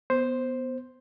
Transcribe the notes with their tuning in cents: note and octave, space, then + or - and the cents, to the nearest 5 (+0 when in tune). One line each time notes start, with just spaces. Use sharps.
B3 +0 C5 +0